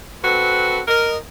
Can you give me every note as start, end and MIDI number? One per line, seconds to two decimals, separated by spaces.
0.24 0.81 60
0.24 0.81 66
0.24 0.81 69
0.24 0.81 71
0.88 1.17 70
0.88 1.17 75